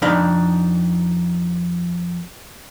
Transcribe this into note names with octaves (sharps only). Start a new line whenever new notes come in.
F2 D4 D#4 D#5 F5 B5